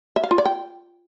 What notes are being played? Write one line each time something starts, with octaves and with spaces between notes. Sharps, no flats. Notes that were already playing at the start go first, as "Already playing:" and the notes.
E5
F5
F4
D5
G5